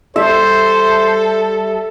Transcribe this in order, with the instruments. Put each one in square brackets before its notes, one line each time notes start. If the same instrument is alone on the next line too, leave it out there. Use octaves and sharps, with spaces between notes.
[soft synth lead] G3 [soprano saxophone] A4 [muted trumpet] C5 [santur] E5